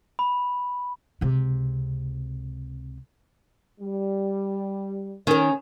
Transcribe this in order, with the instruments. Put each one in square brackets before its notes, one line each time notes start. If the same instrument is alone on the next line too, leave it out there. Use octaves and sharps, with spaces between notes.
[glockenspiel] B5
[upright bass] C#2 C3
[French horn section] G3
[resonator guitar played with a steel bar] D#3 [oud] C#4 A#4 [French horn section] C#5